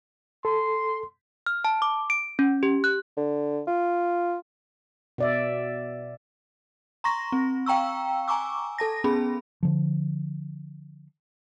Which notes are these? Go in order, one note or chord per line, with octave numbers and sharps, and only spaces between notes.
A4 C6
F6
A5
D6
D7
C#4
G4
F#6
D3
F4
B2 D5 E5
A#5 C6 C#6 A#6
C4
F5 G5 A#5 C#6 E6
G#5 A#5 C#6 D6 E6
A4 A5 A#6
B3 C#4 G#4 B5
D3 F3